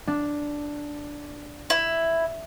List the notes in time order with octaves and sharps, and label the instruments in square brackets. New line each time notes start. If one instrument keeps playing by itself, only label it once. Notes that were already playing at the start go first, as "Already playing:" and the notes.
[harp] D4
[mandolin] E4